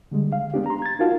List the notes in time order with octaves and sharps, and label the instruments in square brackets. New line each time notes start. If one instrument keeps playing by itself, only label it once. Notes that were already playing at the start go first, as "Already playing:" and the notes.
[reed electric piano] D3 G3 G#3
F5
G#3 B3 D4 G4
A#5 C6
G#6 A6
D#4 F4 F#4 A#4 F5 A5